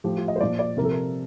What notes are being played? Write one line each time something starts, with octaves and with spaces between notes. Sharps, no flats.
A2 F3 G4
F4
D#5
C5
A#2 F3 D5
D5
C3 F3 A4 A#4
A#4